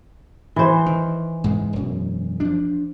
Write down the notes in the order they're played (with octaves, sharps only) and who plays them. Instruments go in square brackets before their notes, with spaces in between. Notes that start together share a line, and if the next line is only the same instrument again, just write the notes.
[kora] E3 C5
[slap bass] D#3
G#2 C#3 G#3
E1 F#2
F3 D4